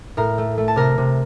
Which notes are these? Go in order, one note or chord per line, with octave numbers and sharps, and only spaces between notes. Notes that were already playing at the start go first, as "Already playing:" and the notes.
A2 A#4 A#5
A3
A3
A5
C3 A#4 A#5
C3